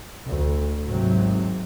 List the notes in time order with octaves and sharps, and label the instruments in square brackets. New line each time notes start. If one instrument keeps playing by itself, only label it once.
[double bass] D2
[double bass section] G#1 [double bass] C3 F#3